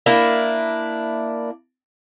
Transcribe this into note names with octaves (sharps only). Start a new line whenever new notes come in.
A#3 D4 E4